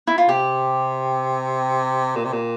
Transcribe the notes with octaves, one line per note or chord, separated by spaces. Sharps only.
E4
F4
C3 G4
A#2
C3
A#2